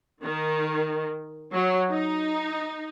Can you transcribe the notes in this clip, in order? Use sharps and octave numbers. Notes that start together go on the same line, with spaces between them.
D#3
F#3
D#4